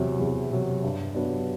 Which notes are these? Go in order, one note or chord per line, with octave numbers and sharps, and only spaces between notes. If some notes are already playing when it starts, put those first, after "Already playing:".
Already playing: E2 C3 F#3
E2
C3 F#3
G2
F#3 B3 D4